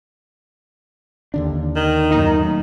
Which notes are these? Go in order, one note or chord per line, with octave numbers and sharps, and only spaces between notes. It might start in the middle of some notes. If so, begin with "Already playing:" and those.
D#2 D3 D4
D#3
F#2 A2 A#3 D#4